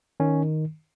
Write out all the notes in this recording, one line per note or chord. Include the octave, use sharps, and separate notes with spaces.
D#3 C#4